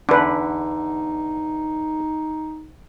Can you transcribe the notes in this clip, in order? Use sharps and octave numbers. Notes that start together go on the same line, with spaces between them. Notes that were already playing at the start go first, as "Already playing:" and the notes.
E2 D3 D4 D#4 B4